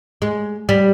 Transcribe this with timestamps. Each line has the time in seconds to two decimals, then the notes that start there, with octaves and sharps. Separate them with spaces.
0.22 G#3
0.69 G3